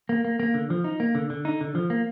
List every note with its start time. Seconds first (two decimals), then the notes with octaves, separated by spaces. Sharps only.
0.09 A#3
0.25 A#3
0.40 A#3
0.54 D3
0.70 F3
0.84 D#4
1.00 A#3
1.15 D3
1.30 D3
1.45 D#4
1.61 D3
1.75 F3
1.90 A#3